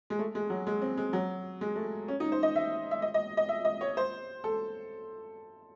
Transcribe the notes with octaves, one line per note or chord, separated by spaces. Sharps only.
G#3
A3
G#3
F#3
G#3
C4
G#3
F#3
G#3
A3
C#4
D#4
C5
D#5
E5
E5
D#5
D#5
D#5
E5
D#5
C#5
C5
A4